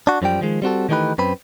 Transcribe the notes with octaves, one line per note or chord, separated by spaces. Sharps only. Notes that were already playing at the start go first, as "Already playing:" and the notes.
D4 F#4
F#2 F3 G3 G5
D#3 F3 G#3
G3 C4 F#4 A4
D#3 E3 A3 D#4 G4 B4
F#2 C4 B4 B5